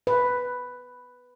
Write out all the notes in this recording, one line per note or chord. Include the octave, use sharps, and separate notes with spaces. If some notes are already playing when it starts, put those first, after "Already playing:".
B4